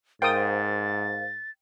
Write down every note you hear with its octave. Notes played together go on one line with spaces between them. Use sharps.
G#2 A#4 C5 F5 G5 D#6 A6